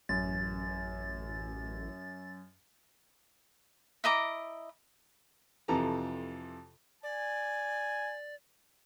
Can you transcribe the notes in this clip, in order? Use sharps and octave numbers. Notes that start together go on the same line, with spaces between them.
A1 F#2 A6
E4 D#5 A#5 D6
F2 C3 E3 A4 A#5
D5 G#5